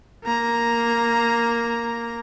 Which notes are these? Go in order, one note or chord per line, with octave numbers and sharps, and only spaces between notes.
A#3 A#5